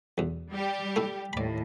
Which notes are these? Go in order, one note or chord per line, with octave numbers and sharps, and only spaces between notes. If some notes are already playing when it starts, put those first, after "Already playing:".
B1 E2
G3 G4
A3 E4
D#2 A2 D5 B5